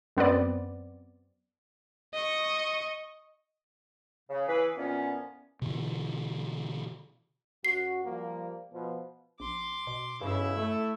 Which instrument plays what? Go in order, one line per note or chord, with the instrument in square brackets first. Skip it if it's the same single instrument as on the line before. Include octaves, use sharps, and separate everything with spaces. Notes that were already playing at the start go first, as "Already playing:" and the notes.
[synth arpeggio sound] F#2 B3 C4 D5
[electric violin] D#5 C#6
[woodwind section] C#3
E3 G#4 B4
F2 A#2 E3 B3 C#4
[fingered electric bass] B2 D3 E3
[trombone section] F#2 F#4 [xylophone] C7
[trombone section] F3 G3 A#3
B2 F3
[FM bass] A#1 [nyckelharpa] C6 D6
[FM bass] B2
[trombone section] B1 C#3 [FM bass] G2 [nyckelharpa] E4 E5
[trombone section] A3